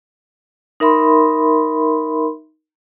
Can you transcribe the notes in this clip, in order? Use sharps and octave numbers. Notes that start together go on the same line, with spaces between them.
D#4 A#4 E5 B5 C6